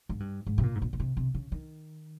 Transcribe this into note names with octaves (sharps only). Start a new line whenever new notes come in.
G#2
G2
G#2
C3
A#2
G#2
A#2
A#2
C3
C3
C#3
D#3